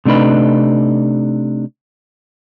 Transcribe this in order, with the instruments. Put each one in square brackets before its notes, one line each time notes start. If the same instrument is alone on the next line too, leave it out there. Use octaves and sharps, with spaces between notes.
[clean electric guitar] C3 A3 D4 D#4 B4